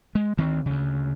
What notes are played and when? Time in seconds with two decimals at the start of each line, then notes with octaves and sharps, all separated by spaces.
0.15 G#3
0.37 D2 D#3 C4
0.66 D2 C#3